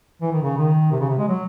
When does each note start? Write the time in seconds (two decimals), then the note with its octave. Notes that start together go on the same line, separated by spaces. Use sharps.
0.21 E3
0.32 D#3
0.42 C#3
0.57 D#3
0.91 C3
1.00 C#3
1.09 C3
1.18 G#3
1.28 F#3